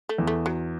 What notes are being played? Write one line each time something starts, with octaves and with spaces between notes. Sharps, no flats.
A3
E2
A3
F#3